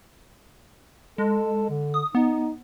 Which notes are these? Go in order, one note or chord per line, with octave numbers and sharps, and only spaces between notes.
G#3 A4
D3
D#6
B3 D#4